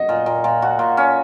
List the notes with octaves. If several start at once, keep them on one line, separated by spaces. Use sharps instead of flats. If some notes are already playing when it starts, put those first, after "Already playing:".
Already playing: F#4 D#5
A#2
A#2
A#2
F#4
A#2
C#4